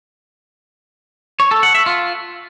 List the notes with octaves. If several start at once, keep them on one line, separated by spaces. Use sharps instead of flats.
C#5
A4
F#5
E5
F4